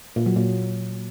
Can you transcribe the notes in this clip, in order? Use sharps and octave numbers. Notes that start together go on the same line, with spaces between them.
A#2
F#3
A#2